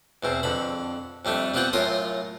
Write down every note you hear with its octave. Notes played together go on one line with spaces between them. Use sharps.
E2 B2 C4
F2 D3 B5
F2 G3 A3 D4
G3 B3 C4 F4 F#5 G5
F#2 A2 F4 A#4 C6 D#6